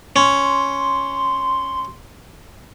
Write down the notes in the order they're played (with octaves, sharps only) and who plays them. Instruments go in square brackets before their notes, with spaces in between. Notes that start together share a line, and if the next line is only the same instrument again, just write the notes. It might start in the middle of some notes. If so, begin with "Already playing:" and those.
[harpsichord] C#4 [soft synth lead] C6